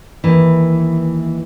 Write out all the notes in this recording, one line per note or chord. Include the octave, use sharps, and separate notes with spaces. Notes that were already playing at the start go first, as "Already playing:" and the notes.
D#2 E3